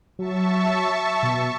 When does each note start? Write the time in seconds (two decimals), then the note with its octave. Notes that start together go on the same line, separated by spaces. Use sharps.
0.19 F#3 E5 A5 C#6
1.23 B2